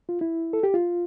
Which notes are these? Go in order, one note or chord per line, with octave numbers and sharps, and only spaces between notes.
F4
E4
A4
G4
F4